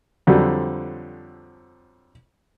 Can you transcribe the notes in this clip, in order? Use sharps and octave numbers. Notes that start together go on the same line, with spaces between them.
F2 D3 F#3 G3 C4